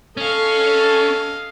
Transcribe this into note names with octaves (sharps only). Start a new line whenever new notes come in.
C#4 A4 D#5 F5